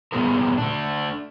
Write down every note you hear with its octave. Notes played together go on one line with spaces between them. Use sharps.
A#2 G3 B3 F4 G#4 A#4
A3 D4